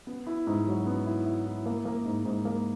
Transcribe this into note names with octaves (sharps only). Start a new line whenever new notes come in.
B3
E4
G#2
F#3
B3
E4
E4
E4
A#3
A#3
G#2
G#2
A#3